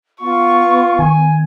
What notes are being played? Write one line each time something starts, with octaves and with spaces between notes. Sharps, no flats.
B3 F4 C#6
D#3 G#5